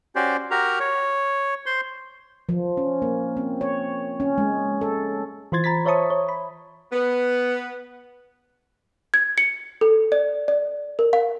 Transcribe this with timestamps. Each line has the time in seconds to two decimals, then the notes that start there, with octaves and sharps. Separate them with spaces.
0.16 C#4 F#4 G4 C5 D5
0.51 F#4 G4 A#4 A#5
0.80 C#5
1.66 C5 C6
2.49 F3
2.77 C#4
3.02 A#3
3.37 C4
3.61 C#5
4.20 C#4
4.38 G#3
4.81 A4
5.52 E3 F4 C5 C6 G#6 A6
5.64 A#5 B5 A6 B6
5.86 C5 C#5 E5 A5 C#6 D#6
6.10 C#5
6.29 B5
6.93 B3
9.14 G#6
9.38 C#7
9.81 A4
10.12 D5
10.48 D5
10.99 A#4
11.13 F5